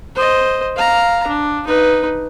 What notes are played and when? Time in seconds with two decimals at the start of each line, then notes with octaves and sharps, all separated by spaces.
0.16 C5 D#5
0.76 F5 A#5
1.27 D4
1.67 D#4 B4